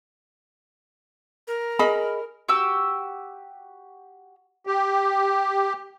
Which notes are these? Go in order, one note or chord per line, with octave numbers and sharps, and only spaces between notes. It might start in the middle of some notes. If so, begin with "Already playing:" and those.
A#4
G#4 D#5 B5
F#4 G4 E6
G4